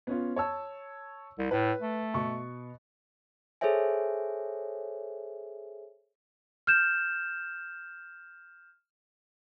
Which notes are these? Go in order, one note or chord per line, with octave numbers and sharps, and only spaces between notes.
B3 C#4 F4
C#5 A5 E6
C2
A2 B4
A3
B2 C#6
G#4 A4 C5 C#5 E5 G#5
F6 G6 E7